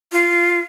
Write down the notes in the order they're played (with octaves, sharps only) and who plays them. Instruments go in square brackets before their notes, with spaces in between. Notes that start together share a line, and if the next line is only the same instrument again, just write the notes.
[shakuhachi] F4